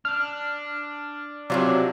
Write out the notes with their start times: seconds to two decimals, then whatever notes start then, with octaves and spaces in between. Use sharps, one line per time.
0.05 D4 F6
1.50 C3 F#3 C#4 F4 D5